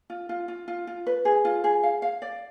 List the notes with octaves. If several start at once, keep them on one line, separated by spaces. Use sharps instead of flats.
F4
F4
F4
F4
F4
B4
G#4
F4
G#4
F5
F5
D5